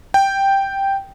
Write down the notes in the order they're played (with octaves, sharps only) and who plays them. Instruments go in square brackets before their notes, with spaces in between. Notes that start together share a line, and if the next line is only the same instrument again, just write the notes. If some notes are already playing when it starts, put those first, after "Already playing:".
[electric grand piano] G5